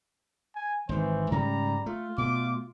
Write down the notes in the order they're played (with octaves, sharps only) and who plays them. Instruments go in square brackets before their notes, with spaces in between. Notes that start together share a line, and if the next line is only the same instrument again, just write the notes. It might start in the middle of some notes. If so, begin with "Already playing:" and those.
[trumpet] G#5
[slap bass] G#1 D#3 [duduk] E3 [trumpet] C5
[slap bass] G#2 C#3 C#4 [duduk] G3 [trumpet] A#5
[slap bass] A3 [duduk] F4
[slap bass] B2 A3 [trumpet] D6